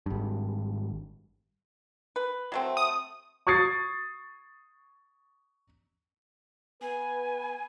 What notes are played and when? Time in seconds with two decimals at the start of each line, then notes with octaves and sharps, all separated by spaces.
0.06 G#1 G2
2.16 B4
2.52 F#3 A3 C4
2.77 D#6
3.47 C#6 D#6 G#6 A6 C7
6.82 B3 B4 G#5